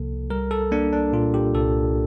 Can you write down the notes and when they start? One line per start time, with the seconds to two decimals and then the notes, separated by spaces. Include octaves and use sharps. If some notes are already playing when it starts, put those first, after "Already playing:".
Already playing: C2 C3 F3 A#3 A4
0.30 G3 A#4
0.51 A4
0.72 A#3 D4
0.93 D4
1.13 A#2 F4
1.34 G4
1.54 C2 A4